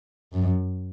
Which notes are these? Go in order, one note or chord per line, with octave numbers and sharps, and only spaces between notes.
F#2